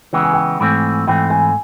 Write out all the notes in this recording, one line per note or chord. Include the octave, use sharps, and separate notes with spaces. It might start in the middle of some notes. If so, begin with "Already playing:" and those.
C#3 E3 G#3 B3 G5
G#5
G5
G#2 E3 A3 C4
G#2 E3 A3 C4 G5
G#5